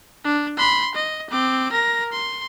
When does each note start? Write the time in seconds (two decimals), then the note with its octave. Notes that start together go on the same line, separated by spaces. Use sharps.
0.24 D4
0.57 B5 C6
0.95 D#5
1.31 C4 D6
1.72 A#4 A#6
2.13 C6